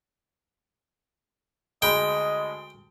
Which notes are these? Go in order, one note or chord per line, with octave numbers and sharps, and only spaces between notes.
D2 G#3 D#5 G5 B5